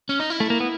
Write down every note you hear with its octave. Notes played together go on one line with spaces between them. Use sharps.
C#4
D#4
E4
A3
A#3
B3